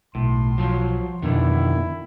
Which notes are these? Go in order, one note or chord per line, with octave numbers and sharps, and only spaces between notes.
B1 A2 C6
F3 F#3
F2 B2 D3 D#3 E4